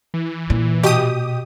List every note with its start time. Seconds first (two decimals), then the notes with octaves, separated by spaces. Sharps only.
0.14 E3
0.50 A#2
0.83 B2 G4 D#6